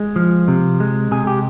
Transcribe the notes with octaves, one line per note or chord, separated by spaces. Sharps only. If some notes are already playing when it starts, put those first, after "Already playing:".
Already playing: G#3
F3
C3
G#3
C3 G#4
G4